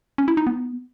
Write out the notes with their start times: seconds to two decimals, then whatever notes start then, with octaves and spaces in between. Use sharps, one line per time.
0.18 C#4
0.28 E4
0.37 D#4
0.47 B3